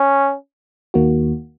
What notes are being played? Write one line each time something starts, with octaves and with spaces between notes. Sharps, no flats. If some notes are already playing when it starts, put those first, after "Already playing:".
Already playing: C#4
D#2 D#3 A#3 F#4